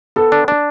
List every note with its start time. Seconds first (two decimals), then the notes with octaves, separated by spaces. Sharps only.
0.16 B3 A4
0.32 D4
0.48 D4